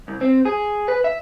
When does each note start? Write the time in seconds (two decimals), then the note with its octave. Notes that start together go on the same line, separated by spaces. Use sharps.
0.08 C2
0.21 C4
0.45 G#4
0.88 B4
1.04 E5